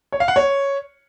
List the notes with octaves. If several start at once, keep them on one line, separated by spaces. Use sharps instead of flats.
C#5
F5
F#5
C#5